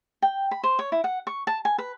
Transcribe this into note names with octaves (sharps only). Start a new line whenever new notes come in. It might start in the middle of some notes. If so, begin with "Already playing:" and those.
G5
B5
C5
C#5
E4
F#5
C#6
A5
G#5
B4